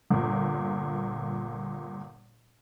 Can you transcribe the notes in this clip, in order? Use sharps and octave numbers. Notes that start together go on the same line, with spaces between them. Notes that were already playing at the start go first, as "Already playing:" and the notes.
G1 A#2